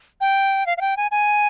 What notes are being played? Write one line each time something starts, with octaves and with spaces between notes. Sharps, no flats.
G5
F5
F5
G5
G#5
G#5